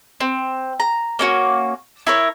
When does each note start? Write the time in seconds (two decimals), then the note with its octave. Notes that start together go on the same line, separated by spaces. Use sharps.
0.20 C4
0.80 A#5
1.19 A#3 C#4 F#4
2.07 E4 A#4 C#5